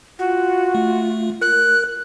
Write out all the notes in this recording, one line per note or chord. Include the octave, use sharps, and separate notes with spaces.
F4 F#4
A3
A#4 F#6